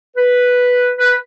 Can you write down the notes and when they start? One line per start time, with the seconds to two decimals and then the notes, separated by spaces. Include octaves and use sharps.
0.17 B4
0.98 B4